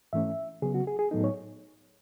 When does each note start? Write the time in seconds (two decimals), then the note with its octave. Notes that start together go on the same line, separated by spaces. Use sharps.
0.13 G#2 E3 A3 C#4 E5
0.62 C#3 F#3 B3 G#4
0.74 F#4
0.87 G#4
0.99 G#4
1.11 A2 F#3 B3 D#4 A4
1.24 C#5